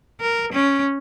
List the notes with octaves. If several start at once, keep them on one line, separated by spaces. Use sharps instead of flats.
A#4
C#4